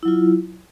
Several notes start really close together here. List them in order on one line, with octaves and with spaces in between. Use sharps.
E4 F#3 F4